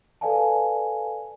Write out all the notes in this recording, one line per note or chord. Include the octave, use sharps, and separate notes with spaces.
A4 B4 D5 F5 G#5 A5